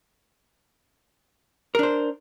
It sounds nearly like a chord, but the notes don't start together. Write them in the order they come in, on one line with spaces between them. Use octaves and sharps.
A#4 D4 C5